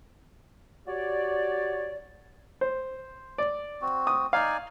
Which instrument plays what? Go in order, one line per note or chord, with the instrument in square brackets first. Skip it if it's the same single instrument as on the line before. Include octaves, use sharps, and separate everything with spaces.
[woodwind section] F#4 G4 C#5 D5
[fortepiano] C5
D5
[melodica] C4 F#4
[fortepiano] D#6
[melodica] D#4 D5 G#5 [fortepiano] F5